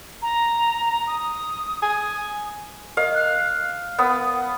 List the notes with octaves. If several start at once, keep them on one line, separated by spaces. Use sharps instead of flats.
A#5
D#6
G#5
A#4 D#5 F5
F#6
B3 A#4 C#5 D#6